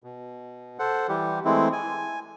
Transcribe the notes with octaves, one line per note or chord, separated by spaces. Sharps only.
B2
A4 C5 F#5
E3 G3 G4
E3 G#3 A3 C4 E4
G#5